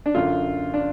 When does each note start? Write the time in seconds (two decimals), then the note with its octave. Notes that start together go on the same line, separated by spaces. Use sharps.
0.06 D4
0.14 F#2 D3 F4
0.74 D4